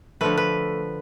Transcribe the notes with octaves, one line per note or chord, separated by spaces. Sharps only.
D3 F3 A3 B4
B4